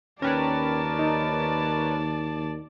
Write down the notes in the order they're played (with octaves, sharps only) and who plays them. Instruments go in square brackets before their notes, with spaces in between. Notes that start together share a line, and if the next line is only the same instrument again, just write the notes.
[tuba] D#2 [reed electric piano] C#4 G5 [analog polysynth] A#4 B4 C#5 [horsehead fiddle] D5 A5
[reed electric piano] D#4